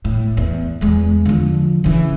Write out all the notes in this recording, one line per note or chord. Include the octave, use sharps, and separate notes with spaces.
A2
E2
E2 G#3
D3 F3
C#3 E3